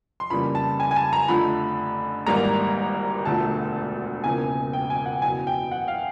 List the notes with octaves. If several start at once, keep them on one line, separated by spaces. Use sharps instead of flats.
C6
F2 C#3 E3 G3 A#3 B5
A5
G#5
G#5
A5
A#5
F2 D3 F3 A3 B5
G#1 G#2 E3 G3 A#3 A#5
E1 D2 D3 F3 A3 A5
E1 E2 C#3 F3 A#3 G#5
G5
G#5
F#5
F#1 E2 B2 G#5
G5
F#5
F5